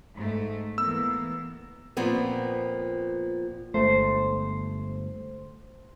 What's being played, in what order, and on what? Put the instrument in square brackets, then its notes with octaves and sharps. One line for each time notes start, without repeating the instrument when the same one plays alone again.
[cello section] G#2 A3
[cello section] E3 A#3 B3 [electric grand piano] E6
[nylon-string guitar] A#2 F3 B3 C4
[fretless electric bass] G1 G#3 A3 [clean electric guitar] C5